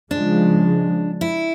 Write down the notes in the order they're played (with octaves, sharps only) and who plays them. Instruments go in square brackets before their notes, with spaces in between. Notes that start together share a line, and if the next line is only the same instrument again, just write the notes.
[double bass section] C#3 F3 G#3 [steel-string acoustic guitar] D4
[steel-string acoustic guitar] E4